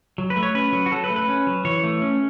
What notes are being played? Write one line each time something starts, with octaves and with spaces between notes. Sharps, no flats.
F#3
B4
A3
C#5
C#4 B4
F#3
F#4
F#3 A4
B4
A3
B4
C#4
F#3
E3 C#5
A3
C#4